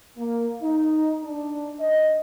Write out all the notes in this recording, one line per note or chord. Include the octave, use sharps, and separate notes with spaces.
A#3
D#4
D4
D#5